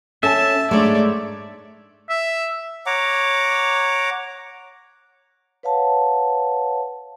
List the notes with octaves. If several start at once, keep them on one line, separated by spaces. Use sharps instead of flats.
C#4 A4 E5 G#5 A5
G#2 A3 D4 C#5 D5
E5
C#5 F#5 A#5 D6
B4 C#5 F5 F#5 A5